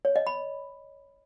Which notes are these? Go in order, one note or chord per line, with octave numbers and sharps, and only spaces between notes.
C#5
D#5
B5